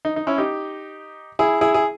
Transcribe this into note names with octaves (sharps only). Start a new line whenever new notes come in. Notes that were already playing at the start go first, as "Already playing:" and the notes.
D#4
D#4
C#4 E4
D#4 G4
E4 G#4
E4 G#4
G#4